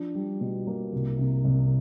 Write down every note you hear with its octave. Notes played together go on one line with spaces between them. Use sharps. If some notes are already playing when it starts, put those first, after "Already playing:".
Already playing: F3 D4
G3
B2
A#3
C2
C3
C2